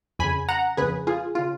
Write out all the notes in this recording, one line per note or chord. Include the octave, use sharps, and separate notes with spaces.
F2 C#3 G#5 B5
F#5 A#5
F2 C#3 G#4 B4
F4 G#4
C#3 F4